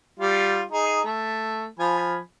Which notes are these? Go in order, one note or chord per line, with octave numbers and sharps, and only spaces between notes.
G3 F4
D#4 G#4
A3
F3 G#5 B5